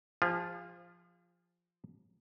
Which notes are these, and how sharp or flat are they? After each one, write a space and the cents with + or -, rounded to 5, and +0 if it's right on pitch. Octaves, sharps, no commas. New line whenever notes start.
F3 +0 F4 +0 G#4 -40